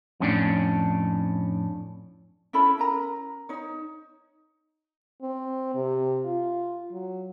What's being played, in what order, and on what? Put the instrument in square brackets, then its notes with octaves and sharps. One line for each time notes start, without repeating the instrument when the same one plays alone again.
[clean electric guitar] F2 A2 C#4 D4
[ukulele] C#4 E4 A4 B5
C#4 A#4 A#5
D#4 C#5
[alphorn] C4
C3
F4
F#3